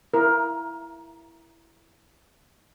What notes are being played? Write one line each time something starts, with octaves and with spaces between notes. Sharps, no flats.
E4 A#4